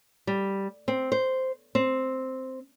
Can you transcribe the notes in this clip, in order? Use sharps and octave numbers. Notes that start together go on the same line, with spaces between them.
G3
C4
C5
C4